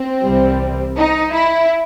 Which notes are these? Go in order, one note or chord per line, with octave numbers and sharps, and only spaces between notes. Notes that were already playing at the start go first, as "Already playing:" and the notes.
Already playing: C4
C2 C3 E3 G3
D#4
E4